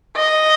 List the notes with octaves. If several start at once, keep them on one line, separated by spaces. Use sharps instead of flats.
D#5